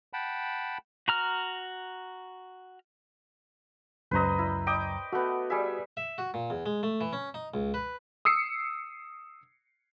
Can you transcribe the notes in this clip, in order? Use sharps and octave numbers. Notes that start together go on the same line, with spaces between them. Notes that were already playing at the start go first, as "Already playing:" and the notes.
F#5 G5 A5 B5
F#4 A#5 F6
C#2 F#2 B4 C5 D#5 A#5
E4
D#5 G5 D6
A3 B3 F#4
G3 G#4 E5
E5
F#4
A#2
E2
G#3
A3
E3
C#4
D#4
C#2
B4
D#6 E6 C7 C#7